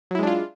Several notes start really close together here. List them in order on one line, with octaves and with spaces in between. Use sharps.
F#3 E4 G#3 D4 F4